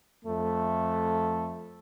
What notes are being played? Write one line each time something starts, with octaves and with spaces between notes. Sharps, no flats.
F2 A3